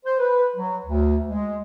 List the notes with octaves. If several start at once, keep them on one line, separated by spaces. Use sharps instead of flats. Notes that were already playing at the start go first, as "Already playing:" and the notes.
C5
B4
F#3
D2
G#3